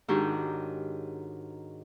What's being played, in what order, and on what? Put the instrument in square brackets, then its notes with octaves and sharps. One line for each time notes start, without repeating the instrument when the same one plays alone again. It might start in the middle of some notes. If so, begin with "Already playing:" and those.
[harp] G#2 D#3 D4 F#4 G4 C#5